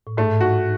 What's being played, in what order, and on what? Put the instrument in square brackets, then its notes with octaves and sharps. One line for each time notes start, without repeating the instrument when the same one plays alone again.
[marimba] A2
[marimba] G#2 [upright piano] A3
[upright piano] F#4